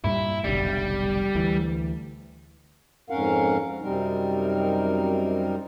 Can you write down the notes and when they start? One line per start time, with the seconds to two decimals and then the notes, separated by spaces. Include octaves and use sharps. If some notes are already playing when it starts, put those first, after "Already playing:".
0.04 G2 A#2 G3 E4
0.44 F1 B1 D3 G3
1.35 D2 E3
3.10 F2 G#2 C#4 A#4 F5 F#5
3.82 F#2 C3 G3 C4 D#4 A#4